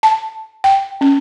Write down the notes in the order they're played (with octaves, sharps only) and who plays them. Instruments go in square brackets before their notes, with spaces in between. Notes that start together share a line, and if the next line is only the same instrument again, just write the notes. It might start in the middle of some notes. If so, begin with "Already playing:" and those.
[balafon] A5
G5
C#4